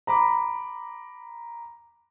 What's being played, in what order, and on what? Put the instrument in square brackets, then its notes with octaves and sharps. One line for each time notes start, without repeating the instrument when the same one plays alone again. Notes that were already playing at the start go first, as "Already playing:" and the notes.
[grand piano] A#5 B5 D6